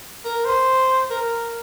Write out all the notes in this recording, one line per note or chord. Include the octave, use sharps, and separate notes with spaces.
A#4
C5
A#4